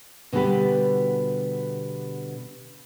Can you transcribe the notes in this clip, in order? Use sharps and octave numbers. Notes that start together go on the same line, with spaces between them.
B2 D3 G3 B3 G4 B4